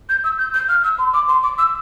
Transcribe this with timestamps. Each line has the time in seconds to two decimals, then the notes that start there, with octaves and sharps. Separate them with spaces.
0.09 G6
0.24 E6
0.38 G6
0.54 G6
0.69 F6
0.84 E6
0.98 C6
1.13 D6
1.28 C6
1.43 D6
1.58 E6